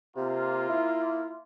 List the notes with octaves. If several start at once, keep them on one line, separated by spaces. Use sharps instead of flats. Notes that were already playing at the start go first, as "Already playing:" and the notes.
C3 A#3 F4
E4